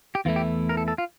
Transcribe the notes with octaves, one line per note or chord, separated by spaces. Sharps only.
G4
E2 E3 A3 E4 F4
G4
A#4
A4
A4
F4